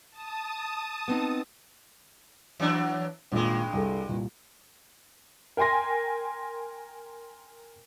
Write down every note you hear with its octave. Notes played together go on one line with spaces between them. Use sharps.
A5 D#6
B3 C4 D#4
E3 F#3 D4
G#1 G2 A#2 G#3
C2 G#4 A4
C2 A#2
A#4 G5 G#5 C6 A#6